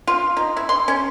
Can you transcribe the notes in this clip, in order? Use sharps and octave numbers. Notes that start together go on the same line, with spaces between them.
F4
D#4
E4
C6
C#4